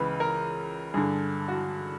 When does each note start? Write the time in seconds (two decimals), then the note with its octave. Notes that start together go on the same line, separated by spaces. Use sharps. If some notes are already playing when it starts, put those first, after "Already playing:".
Already playing: C#2 C#3 E3 B4
0.20 A#4
0.94 G2 D3 G#4
1.48 F#4